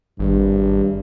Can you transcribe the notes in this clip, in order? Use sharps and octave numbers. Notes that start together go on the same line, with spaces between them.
G#1 G2